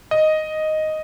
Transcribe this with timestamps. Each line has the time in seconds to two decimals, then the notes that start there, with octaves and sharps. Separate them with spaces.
0.11 D#5